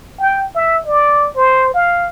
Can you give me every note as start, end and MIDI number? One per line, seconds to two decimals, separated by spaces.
0.20 0.43 79
0.55 0.78 76
0.87 1.29 74
1.36 1.70 72
1.74 2.09 77